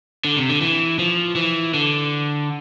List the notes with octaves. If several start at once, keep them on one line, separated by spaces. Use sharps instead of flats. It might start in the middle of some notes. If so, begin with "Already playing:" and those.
D3
C3
D3
E3
F3
E3
D3